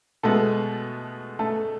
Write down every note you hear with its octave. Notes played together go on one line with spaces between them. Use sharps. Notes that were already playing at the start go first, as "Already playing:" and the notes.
B2 G#3 A3 B3 A4
A3 A4